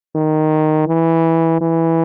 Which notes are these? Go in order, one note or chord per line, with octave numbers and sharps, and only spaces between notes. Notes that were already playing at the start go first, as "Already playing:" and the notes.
D#3
E3
E3